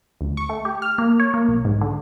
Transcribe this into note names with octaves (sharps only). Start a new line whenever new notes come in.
D2
C#6
A3
G4
F6
A#3
C#5
A#3
B1
G#2
D3